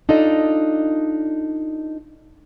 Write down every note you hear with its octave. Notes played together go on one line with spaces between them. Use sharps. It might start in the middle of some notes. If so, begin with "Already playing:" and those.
D4 D#4 F4 A4 D5 D#5